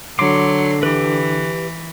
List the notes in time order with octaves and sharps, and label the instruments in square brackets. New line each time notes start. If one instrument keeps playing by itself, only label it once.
[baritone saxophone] D3 [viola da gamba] F#3 [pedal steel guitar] C6 D6
[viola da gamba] E3 [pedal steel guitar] G4 B4